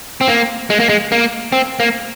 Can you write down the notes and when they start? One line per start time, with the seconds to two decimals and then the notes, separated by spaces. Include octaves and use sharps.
0.21 C4
0.28 A#3
0.70 G#3
0.80 A#3
0.89 G#3
1.12 A#3
1.52 C4
1.80 A#3